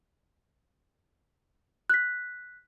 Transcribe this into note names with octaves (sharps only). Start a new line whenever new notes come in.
F#6 B6